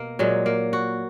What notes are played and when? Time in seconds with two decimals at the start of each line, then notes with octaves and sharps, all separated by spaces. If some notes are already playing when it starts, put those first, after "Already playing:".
Already playing: B2 A#3
0.19 A#2 F#3 G#3
0.46 A#3
0.73 F#4